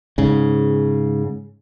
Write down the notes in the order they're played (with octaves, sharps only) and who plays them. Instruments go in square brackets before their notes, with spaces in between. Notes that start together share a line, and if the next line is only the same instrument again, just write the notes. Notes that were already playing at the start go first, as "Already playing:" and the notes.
[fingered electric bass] G#2 C#3